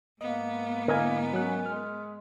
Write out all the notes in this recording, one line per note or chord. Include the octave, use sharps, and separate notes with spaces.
G#2 A#3 B3 D#5
D3 A#3 E4 A#4 D#5 G#5
F#3 C#4 F#6
G#3 F6